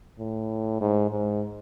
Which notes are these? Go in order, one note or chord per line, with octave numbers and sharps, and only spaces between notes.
A2
G#2
G#2